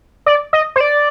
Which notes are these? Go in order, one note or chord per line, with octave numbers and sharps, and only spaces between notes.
D5
D#5
C5
D5